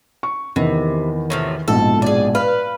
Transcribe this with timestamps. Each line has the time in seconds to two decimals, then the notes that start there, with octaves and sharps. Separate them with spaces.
0.23 C#6
0.56 E2 C3 D#3 E3
1.30 A2 C3 F3
1.68 A#1 G#2 B2 A4
2.02 G#4 D5
2.35 B4 F5